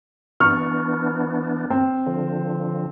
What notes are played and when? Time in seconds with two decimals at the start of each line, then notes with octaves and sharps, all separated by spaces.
0.40 E3 B3 D4 A#5 C#6 F6
1.70 C4
2.06 D3 F3